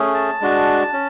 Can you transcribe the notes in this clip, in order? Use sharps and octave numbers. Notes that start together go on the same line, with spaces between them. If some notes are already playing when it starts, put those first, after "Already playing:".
Already playing: A3 C#4 G#4
A5
G#3 D4 F#4
C#4